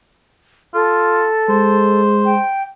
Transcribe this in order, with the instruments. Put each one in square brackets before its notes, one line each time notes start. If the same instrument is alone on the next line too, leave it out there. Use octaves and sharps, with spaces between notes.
[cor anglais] F4 [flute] A4
[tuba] G#3 [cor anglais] C5
[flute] G5